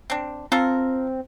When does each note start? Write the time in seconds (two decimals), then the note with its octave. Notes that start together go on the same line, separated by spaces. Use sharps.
0.10 C4 D4
0.52 C4 F4 A4 A#4